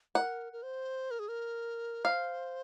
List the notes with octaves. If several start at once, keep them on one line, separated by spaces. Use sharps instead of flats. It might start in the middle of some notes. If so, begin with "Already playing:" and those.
A#4 F#5
A#4
C5
A#4
G#4
A#4
C5 F5